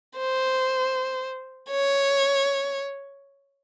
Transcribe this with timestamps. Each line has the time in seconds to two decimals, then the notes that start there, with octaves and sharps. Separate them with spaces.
0.18 C5
1.71 C#5